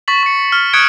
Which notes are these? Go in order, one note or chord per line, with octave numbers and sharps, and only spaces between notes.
C#6 A6 B6 F#7
C#6 C#7
F6
C#6 D#6 F#6 G#6 C#7 D7